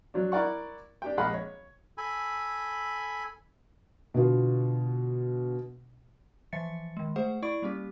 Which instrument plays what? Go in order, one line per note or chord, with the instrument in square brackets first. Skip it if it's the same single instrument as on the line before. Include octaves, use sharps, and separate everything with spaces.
[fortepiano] F#3 D4
E4 A#4 D5 F#5 C#6
D4 G4 G5
A#1 G#3 D#5 F5 F#5 B5
C#5
[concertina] A4 G#5 B5
[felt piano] B2 D3 B3 F4
[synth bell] E3 F3 E5 A6 C#7
D#3 G#3
A3 G#4 C5 F#5
E4 D5 C#6 D7
G3 A#3 C#4 G4